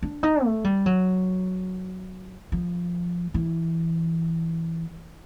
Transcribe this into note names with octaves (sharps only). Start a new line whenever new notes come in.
D4
D#4
A3
G3
F#3
F3
E3